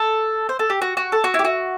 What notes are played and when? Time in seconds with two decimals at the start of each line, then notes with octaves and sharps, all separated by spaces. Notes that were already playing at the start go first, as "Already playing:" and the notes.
Already playing: A4
0.49 C5
0.59 A4
0.70 G4
0.82 F#4
0.97 F#4
1.12 A4
1.24 F#4
1.34 E4
1.39 G4
1.44 F#4